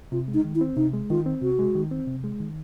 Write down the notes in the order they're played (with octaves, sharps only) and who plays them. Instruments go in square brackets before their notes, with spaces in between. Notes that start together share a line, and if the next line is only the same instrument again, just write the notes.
[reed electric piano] C3 [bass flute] F4
[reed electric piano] G#3
[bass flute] D#4
[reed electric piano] D#3
[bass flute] E4
[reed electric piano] C4
[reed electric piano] C3 [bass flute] D#4
[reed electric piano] G#3
[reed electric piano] D#3 [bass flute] F4
[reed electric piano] C4
[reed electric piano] C3 [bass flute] F#4
[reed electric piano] G#3
D#3
C4
C3
G#3
D#3